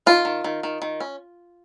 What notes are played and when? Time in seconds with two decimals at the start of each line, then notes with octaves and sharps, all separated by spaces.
0.06 D#3 F4
0.25 D#3
0.44 D#3
0.63 D#3
0.82 D#3
1.00 C#4